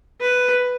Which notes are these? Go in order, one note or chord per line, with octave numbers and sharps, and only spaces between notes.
B4